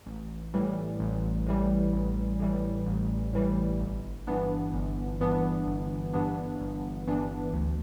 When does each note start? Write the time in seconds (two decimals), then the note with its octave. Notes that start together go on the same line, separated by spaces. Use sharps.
0.06 A1
0.54 A2 E3 G3
1.00 A1
1.47 A2 E3 G3
1.93 A1
2.40 A2 E3 G3
2.87 A1
3.33 A2 E3 G3
3.80 G1
4.27 G2 E3 B3 D4
4.74 G1
5.20 G2 E3 B3 D4
5.66 G1
6.13 G2 E3 B3 D4
6.61 G1
7.07 G2 E3 B3 D4
7.53 D2